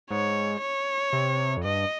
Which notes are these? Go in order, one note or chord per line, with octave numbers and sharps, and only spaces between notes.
G#2 C#5
C#5
C3
F2
G2 D#5